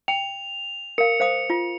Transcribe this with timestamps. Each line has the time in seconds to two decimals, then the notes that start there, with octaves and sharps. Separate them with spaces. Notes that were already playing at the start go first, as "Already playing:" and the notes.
0.08 G5 F7
0.98 A#4 F5 C#7
1.20 C5 F5 D#6
1.50 F4